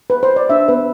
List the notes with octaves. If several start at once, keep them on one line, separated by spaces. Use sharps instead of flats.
B4
C5
D5
D4 E5
B3 B4